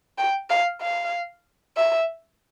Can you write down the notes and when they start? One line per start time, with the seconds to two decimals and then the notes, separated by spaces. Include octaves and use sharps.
0.18 G5
0.50 F5
0.81 F5
1.77 E5